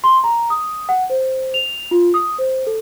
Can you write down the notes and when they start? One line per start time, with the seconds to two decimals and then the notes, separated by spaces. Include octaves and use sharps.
0.04 C6
0.24 A#5
0.50 D#6
0.89 F#5
1.10 C5
1.54 F7
1.91 F4
2.14 D#6
2.38 C5
2.67 A4